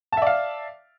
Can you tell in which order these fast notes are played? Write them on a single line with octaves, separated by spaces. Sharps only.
A5 E5 D5 F5